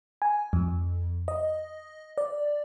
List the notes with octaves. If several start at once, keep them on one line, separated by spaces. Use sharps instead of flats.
G#5
F2
D#5
D5